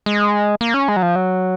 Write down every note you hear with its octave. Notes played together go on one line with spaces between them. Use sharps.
G#3
A#3
C#4
G#3
F#3
F3
F#3